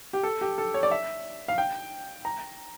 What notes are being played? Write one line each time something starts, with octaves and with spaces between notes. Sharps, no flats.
G4
A4
G4
A4
C#5
D5
E5
F5
G5
A#5